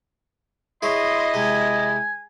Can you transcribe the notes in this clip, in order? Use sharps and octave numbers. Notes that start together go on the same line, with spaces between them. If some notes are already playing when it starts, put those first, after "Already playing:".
E4 G#4 C#5 D#5 C6
C3 G#3 G#5